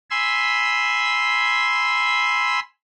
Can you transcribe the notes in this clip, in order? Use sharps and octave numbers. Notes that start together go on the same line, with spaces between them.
G#5 B5 C6 E6